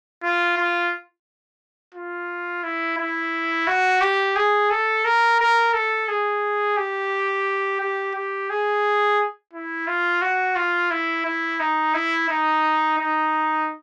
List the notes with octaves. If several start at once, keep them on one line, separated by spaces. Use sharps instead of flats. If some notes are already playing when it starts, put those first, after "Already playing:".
F4
F4
F4
E4
E4
F#4
G4
G#4
A4
A#4
A#4
A4
G#4
G4
G4
G4
G#4
E4
F4
F#4
F4
E4
E4
D#4
E4
D#4
D#4